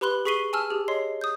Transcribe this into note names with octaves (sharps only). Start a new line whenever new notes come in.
G4 B4 B5 C6 F#6 G7
G#4 C#6 B6 C7 D#7 G7
G#5 A5 E6 F6
G4 G#4
C#5 D#5 C6 C7
D#6 G6